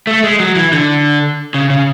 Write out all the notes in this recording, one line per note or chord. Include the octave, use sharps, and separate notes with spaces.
A3
G#3
F#3
E3
D3
C#3
C#3